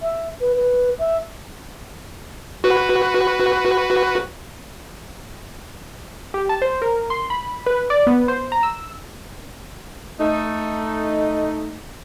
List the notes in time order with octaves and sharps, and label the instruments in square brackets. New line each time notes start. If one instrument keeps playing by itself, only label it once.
[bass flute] E5
B4
B4
E5
[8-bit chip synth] F#4 B4
[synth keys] G4
A5
C5
A#4
C6
B5
B4
D5
B3
C5
A#5
E6
[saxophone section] A3 D#4